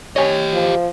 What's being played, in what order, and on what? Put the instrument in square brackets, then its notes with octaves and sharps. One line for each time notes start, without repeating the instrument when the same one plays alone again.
[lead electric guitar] G4 D#5 [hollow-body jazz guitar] C#5 G#5
[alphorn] F3